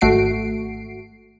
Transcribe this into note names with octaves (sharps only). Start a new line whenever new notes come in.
G#1 A3 F#4 C7 D7